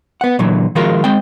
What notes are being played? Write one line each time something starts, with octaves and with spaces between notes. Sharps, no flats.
B3 F#5
A#2 D3 E3 F#3
D#3 F3 G#3 F4 F#4 A#4
G#3 C4 G5